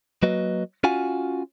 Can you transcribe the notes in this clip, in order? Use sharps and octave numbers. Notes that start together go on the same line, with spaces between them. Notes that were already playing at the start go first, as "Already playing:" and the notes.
F#3 A#3 F#4 B4 D#5
C#4 F4 F#4 F5 F#5 G#5